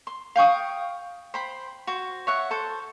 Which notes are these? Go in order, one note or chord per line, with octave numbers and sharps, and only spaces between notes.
C6
F5 G5 C#6 D#6
C5 G5 B5 C6
F#4 C5
C#5 E5 F#5
A4 C5